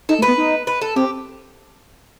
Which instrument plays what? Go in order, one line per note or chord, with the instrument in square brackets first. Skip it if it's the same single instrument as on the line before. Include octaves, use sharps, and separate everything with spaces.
[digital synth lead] D#4 [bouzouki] A4
[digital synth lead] A3
[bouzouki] B4
[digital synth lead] B3
D#4
[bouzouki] B4
A4
[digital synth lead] C4 [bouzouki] G4